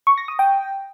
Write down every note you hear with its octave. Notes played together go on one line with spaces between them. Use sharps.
C#6
A#6
D#6
G5